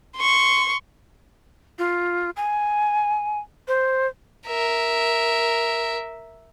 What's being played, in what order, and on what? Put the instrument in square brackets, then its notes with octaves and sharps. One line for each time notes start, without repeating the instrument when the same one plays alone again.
[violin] C6 C#6
[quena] F4
G#5
C5
[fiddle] A#4 E5